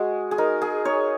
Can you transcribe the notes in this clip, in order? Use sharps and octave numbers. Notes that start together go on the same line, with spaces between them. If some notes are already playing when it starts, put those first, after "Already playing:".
Already playing: G#3 F#4 G#4
G#4
D#4 A#4
G#4
D#4 C#5